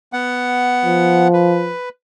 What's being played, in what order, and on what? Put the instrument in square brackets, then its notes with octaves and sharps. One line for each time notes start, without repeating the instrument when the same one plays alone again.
[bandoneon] B3 F#5
[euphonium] F3
[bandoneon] B4